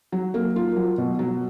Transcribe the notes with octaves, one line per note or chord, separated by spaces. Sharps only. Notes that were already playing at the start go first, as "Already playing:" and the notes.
F#3
A#3
F4
F#3
B2
F#3